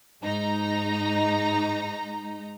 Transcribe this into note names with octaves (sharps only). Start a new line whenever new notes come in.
G#2 D#4 A#5